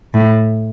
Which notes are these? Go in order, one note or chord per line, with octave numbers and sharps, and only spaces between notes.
A2